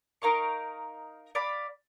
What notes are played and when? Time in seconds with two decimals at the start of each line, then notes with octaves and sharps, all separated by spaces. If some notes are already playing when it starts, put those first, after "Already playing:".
0.22 D#4 A#4 F5 C#6
1.35 D5 F5 B5